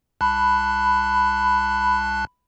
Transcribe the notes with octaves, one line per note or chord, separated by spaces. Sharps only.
C2 A5 B5 F#6